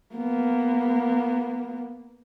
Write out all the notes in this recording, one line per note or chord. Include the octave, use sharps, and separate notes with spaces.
A#3 B3